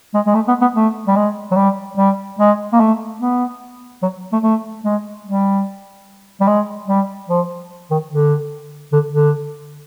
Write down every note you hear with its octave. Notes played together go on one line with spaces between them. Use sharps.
G#3
G#3
A3
B3
B3
A3
G3
G#3
F#3
G3
G3
G#3
A#3
A3
B3
F#3
A3
A3
G#3
G3
G3
G#3
G3
F3
D#3
D3
D3
D3